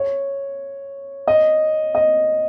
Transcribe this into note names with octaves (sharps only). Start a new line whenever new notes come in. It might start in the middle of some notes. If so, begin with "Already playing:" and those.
Already playing: C#5
D#5
D#5